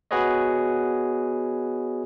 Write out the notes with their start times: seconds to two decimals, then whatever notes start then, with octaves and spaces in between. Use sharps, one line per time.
0.11 B3 F#4 G#4 B4 C#5 D#5